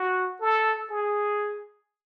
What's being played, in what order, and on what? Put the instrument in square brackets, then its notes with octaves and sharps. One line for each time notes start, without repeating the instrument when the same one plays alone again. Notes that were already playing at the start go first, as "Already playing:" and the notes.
Already playing: [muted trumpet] F#4
A4
G#4